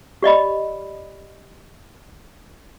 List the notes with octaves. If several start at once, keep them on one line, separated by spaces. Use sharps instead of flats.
G4 D5 D#5 B5